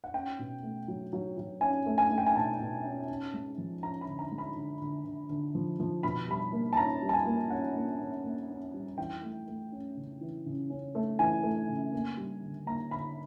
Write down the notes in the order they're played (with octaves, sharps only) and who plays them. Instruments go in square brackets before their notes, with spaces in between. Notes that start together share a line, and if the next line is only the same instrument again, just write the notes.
[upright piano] F#5
C#4 G5
B2
A3
F#3
F#3
F#3
C#4 G#5
A3
G#5
A3
G5
G#5
B2 A5
B2
C#4
C#4
G#3
F3
C#4 A#5
B5
D3
A#5
G#3
B5
D3
D3
D3
D3
F3
F3
B2 B5
G3 B5
A#3
A5
C#4 A#5
G3
A5
G#5
A#3
C#4 F#5
A#3
C#4
A#3
C#4
G3
E3 G5
A3
A3
C#4
C#3
E3
C#3
C#4
A3
E3 G#5
A3
C#3
A#3
G3
D3
A#3 A#5
D3 B5